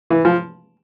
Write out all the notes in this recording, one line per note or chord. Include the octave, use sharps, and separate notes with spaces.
E3
F3